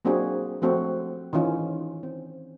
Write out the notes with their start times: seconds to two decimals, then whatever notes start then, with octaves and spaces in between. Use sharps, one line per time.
0.05 F#3 A#3 C4 D4 F#4 G#4
0.62 F3 A3 C4 F#4 A4 C#5
1.33 D#3 E3 C#4 F4
2.03 C4